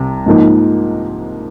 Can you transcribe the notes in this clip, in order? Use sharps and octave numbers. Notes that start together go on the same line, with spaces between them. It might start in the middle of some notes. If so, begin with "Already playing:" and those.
Already playing: C2 C3
G#2 F3 A#3 D#4